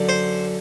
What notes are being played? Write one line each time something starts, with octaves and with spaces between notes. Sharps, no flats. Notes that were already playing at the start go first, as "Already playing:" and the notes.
Already playing: F#2 D3
C5